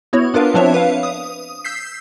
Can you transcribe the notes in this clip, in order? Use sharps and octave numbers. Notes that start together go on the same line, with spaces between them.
B3 E4 F#4 C#5
B3 D4 F4 A#4 B4 F5
F3 C4 D4 C5 C#5 E5
B4 F5
D#6
E6 G6 B6 C7